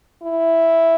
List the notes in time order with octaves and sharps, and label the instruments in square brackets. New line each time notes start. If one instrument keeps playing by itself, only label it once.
[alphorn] E4